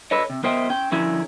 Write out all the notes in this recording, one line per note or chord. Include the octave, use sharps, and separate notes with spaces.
D4 A4 B4 C#5 D#5
C3
B3 A#4 C5 D#5 E5 G5
C#4 G5
D3 F3 C#4 E4 G#4 A#4